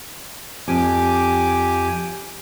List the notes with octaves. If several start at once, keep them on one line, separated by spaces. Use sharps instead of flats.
F2 G4 G#5 D6